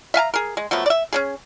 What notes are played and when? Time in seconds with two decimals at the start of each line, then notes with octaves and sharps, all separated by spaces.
0.14 E5 F5 G#5 A#5
0.34 G#4 A#4
0.57 G#3
0.71 F3 F#3 A3 B3
0.86 D5 E5
1.13 C#4 D4 G#4